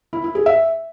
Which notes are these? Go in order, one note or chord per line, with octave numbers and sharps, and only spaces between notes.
E4
E4
G#4
E5